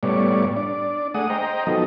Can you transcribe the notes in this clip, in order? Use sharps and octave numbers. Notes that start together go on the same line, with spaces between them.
A2 G3 B3 C#5 D5
D4 D5
A3 G#4 F#5 D#6
C5 D#5 G5 A#5
F3 F#3 B3 D#4 A4 D#5